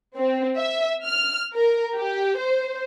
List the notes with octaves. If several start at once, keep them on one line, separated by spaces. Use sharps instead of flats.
C4
E5
F6
A#4
G4
C5